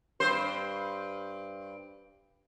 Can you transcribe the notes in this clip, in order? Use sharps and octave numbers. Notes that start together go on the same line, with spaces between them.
G2 C5